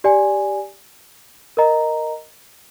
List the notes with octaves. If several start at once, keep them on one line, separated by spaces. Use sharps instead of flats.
G4 D5 G#5
A#4 D#5 A#5